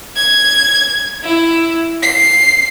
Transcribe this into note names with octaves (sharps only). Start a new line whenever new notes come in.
G#6
E4
C7